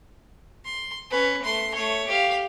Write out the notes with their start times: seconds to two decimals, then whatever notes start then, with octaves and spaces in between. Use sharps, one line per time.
0.65 C6
1.10 C#4 B4
1.42 A3 C6
1.74 A3 C#5
2.07 G4 F5